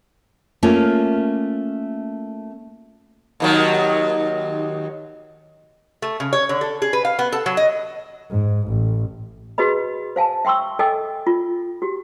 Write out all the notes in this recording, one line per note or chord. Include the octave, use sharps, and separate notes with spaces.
A3 A#3 C#4 F4
D#2 D#3 F#3
A3
C#3
C#5
D3
A4
G#4
B4
F5
B3
A4
F#3
D#5
G#2
A1
F#4 G#4 B4 D#5 B5
C5 F5 G#5 A5
E5 G5 C6 C#6 E6
A4 D#5 G5 G#5 D6 E6
F4
F#4 G4